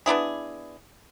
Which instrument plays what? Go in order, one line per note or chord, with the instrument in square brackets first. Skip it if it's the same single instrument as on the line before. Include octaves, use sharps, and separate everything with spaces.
[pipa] B3 D4 E4 G#4